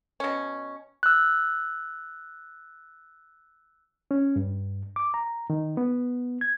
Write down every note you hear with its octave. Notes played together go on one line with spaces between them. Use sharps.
B2 C#4
E6 F#6
C#4
G2
D6
A#5
D#3
B3
G#6